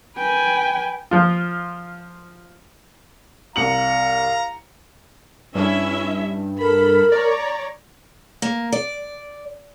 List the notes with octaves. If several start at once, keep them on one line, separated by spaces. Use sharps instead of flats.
B4 G5 G#5
F3 F4
C2 F5 A#5 C#7 F#7
G2 C#4 E4 E5
A4 A#4 B5
C#5 D5 A#5
A#3
D5